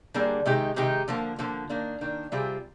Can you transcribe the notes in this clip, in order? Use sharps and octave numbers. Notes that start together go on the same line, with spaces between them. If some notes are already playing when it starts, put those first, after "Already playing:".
D3 G3 A#3 D4 G#4
C3 D#3 G#3 D#4 G4
C3 D#3 G#3 D#4 G4
D3 F3 A#3
D3 F3 A#3
D#3 A#3 D4
D#3 A#3 D4
C3 G3 C4 F4 G#4